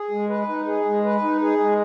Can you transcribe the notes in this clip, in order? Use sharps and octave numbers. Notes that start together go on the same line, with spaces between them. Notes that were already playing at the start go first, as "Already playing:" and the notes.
Already playing: G#4
G#3
B4
D#4
G#4
G#3
B4
D#4
G#4
G#3